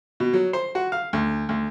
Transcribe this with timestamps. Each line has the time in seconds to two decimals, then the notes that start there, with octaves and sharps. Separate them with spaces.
0.20 B2
0.33 F#3
0.53 C5
0.75 F#4
0.92 F5
1.13 D2
1.49 D2